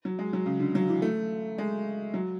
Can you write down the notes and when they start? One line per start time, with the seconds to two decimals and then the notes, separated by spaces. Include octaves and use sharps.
0.05 F#3
0.19 G#3
0.33 F#3
0.46 C#3
0.60 D3
0.75 F#3
0.89 E3
1.02 A3
1.58 G#3
2.14 F#3